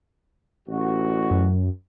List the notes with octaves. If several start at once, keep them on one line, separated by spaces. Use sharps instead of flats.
A1 F#4
F#2